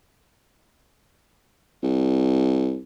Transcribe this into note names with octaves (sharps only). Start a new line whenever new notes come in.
C2